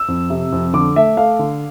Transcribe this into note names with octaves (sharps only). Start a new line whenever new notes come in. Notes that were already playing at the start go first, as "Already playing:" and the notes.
Already playing: E6
F2
C3
F2
D3 D6
A3 E5
A3 F5
D3